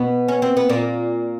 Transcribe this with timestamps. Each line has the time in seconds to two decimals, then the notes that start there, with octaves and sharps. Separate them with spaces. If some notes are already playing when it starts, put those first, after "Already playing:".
Already playing: B2 B3
0.28 C#4
0.42 C4
0.57 B3
0.69 A#2 A#3